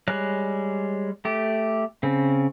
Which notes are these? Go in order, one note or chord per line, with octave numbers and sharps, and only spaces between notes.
G3 G#3 C#5 F#6
A3 G4
C#3 C4